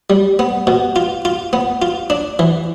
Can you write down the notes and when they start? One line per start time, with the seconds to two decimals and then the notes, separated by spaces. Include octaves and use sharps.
0.10 G3
0.39 B3
0.67 B2
0.96 F4
1.25 F4
1.53 B3
1.82 F4
2.10 D4
2.39 E3